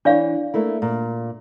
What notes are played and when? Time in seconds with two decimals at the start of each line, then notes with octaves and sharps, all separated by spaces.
0.05 E3 D4 C#5 D5 F5
0.54 A3 A#3 E4
0.82 A#2